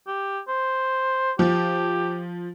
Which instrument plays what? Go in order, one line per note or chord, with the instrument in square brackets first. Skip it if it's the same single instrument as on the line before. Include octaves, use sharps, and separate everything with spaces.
[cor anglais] G4
C5
[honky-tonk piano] F3 [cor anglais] G4